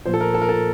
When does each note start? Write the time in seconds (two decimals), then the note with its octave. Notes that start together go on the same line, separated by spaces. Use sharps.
0.06 A#2 F3 C5
0.14 A4
0.21 A#4
0.34 A4
0.41 A#4
0.49 A4